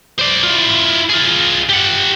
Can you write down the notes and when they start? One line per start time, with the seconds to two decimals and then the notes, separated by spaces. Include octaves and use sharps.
0.19 C5 D5
0.43 E4 F4
1.09 F4 G#4
1.69 G4 F#5